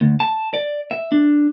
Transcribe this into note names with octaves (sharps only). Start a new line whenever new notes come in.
D2
A5
D5
E5
D4